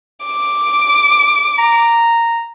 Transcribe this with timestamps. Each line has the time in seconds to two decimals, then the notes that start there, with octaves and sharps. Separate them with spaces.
0.25 D6
1.58 A#5